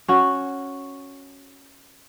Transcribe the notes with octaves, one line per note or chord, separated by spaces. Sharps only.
C#4 F#4